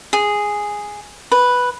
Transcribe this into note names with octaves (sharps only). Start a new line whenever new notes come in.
G#4
B4